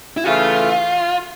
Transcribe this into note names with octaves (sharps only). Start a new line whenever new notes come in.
E4
C#3 E3 A3 F4